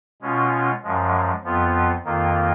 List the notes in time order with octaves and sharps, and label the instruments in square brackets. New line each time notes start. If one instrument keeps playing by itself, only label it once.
[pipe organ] B2 G#3 C#4 F4
F#2 F3 G#3
F2 F3 B3 F4
F2 D#3 A#3 F4